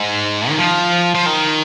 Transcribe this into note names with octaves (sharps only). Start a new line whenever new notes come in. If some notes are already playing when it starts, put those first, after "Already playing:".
Already playing: G#2
D#3
F3
F3
D#3